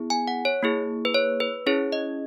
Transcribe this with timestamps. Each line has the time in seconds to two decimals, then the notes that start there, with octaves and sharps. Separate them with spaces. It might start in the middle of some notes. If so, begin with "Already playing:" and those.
Already playing: B3 E4 G#4
0.10 G#5
0.28 F#5
0.45 C#5
0.63 A#3 E4 G#4
1.05 B4
1.15 C#5
1.40 B4
1.66 C#4 E4 G#4 C#5
1.92 D#5